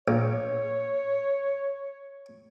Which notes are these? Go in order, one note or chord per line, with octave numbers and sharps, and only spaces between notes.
A#1 C#5